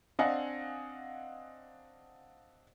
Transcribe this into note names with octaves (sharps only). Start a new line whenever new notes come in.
C4 D4 D#5 F5 F#5 G#5